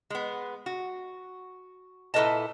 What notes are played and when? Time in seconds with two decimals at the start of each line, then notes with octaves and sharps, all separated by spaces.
0.10 G#3 B3
0.66 F#4
2.14 A#2 E4 A4 B4 D#5 A5